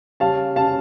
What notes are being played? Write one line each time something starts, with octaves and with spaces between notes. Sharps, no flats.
C#3 G3 C#4 F5 A5
C#3 G3 C#4 F5 A5